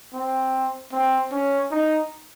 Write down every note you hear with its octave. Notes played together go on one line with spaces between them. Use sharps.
C4
C4
C#4
D#4